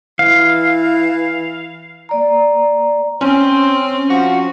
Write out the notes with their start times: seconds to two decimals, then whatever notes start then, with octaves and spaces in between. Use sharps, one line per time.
0.19 E3 F5
2.09 A#3 D5 A#5
3.21 C4 C#4 C5
4.10 F3 F#4 F#5